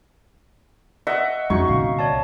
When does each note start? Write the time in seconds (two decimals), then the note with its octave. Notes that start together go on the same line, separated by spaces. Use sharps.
1.07 D#5 E5 F#5
1.50 F2 G#3 C#4 D#4 F#4 C#6
1.68 C2 A#2 D3 F5
1.99 C#5 D5 A5